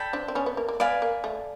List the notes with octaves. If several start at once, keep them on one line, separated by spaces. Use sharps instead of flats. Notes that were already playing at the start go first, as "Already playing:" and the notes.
Already playing: A4 D5 G5 B5
C4 D4
C4
B3 C#4
B3
A#3
A#3
B3 D5 F5 G#5 B5
A#3
A3